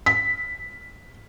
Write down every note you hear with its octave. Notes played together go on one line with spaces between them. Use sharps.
B6